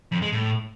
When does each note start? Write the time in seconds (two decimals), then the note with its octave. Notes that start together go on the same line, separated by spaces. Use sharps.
0.12 F2
0.22 G#3
0.32 A2